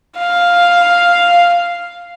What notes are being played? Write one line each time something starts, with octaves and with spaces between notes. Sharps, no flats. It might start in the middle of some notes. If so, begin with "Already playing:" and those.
F5